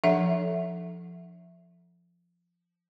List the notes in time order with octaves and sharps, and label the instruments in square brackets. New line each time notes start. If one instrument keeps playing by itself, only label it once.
[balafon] F3 D4 A4 E5 F#5